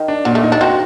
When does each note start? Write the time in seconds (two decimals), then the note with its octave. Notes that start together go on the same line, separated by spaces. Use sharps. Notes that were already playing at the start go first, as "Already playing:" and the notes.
Already playing: D#3
0.08 D4
0.25 A#2 F#3
0.35 A3
0.43 D#4
0.52 D4
0.61 C4 F#4